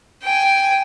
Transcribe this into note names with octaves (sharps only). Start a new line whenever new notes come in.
G5 G#5